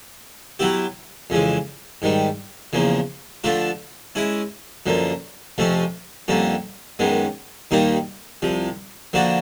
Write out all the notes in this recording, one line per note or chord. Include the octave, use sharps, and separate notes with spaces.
F#3 B3 E4 G4
F2 C#3 E3 G#3
G#2 D#3 G3
E2 C#3 F3 A#3
D3 F3 A3 D4 F4
G#3 C#4 E4
F#2 D3 F3 A#3
F2 C3 F3 A3 C#4
F2 D3 G3 A#3 C#4
F#2 D#3 G#3 B3
D#2 D#3 G3 A#3 D#4
C2 C3 F3
D3 F3 A#3 D4 F#4